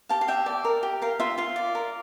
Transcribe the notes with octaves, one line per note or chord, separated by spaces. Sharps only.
G4 F5 A5
F5
G4 E5 G5
D5
A#4
G4
A#4 F5
F4 E5
F4 F5
D5
A#4